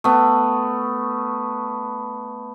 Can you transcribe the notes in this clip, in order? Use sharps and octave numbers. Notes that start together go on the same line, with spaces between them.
A3 B3